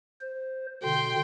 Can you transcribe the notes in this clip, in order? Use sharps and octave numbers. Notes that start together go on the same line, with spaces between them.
C5
B2 D3 G5 C6